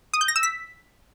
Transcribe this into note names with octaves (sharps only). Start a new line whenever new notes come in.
D#6
G6
A#6
E6
B6